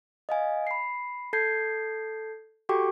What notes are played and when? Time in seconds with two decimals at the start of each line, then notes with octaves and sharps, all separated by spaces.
0.29 D#5 F5 G#5
0.67 B5 C7
1.33 A4 A5 G6 G#6 C7
2.69 F#4 G4 A4 G5 C#6 D6